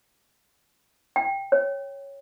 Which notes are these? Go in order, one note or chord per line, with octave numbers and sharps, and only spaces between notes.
G5
C#5